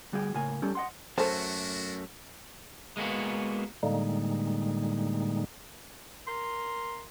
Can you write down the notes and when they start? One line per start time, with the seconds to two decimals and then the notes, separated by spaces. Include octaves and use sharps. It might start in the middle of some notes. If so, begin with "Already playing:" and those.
0.12 D2 G3 F#4 G#4 F5 G5
0.35 A2 C#3 A#3 G#5
0.62 G3 C#4 G4 A4
0.75 D#5 F#5 C6
1.18 F#2 A3 A#3 D4 F#4 A4 C5
2.97 G#3 A#3 B3 F#4
3.83 A2 D3 G3 G#3 A#3 D#4
6.28 A#4 C6